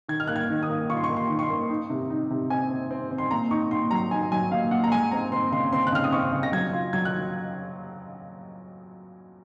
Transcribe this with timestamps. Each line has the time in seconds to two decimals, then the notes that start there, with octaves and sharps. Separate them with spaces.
0.08 D#3 G#6
0.20 F6
0.28 A#3 F#6
0.36 G#6
0.50 D#3
0.63 D#6
0.70 A#3
0.90 F4 C#6
0.97 C6
1.04 C#6
1.10 A#3
1.17 C6
1.29 D#3
1.39 C#6
1.43 C6
1.50 A#3
1.70 D#4
1.90 C3
2.10 D#4
2.31 C3
2.50 C4 G#5
2.70 C4
2.91 C4
3.11 C4
3.18 C6
3.31 A#2 A#5
3.51 D#4 C#6
3.71 A#2 C6
3.91 F#3 A#5
4.11 D#4 G#5
4.32 F#3 G#5
4.51 A#2 F5
4.71 A#2 F#5
4.84 A#5
4.92 G#3 G#5
5.11 C4 A#5
5.32 C4 C6
5.52 C#3 C6
5.72 C4 C6
5.87 F#6
5.92 C#3 F6
6.04 D#6
6.13 C4 C#6
6.32 C#3
6.43 A#6
6.52 F#3 G#6
6.73 F4
6.93 F#3 G#6
7.05 F#6